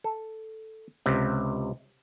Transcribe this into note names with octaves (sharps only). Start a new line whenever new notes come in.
A4
C#2 C3